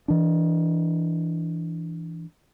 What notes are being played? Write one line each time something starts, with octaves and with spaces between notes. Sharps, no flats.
E3 D4